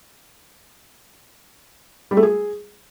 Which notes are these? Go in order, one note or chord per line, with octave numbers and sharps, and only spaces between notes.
G3
A3
G#4